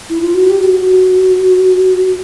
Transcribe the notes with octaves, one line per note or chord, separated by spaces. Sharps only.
E4
F4
F#4
G4
G4
F#4